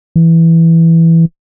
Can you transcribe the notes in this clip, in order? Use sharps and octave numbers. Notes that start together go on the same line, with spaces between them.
E3